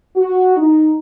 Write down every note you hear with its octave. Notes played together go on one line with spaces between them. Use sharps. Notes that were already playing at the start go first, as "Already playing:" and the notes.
F#4
D#4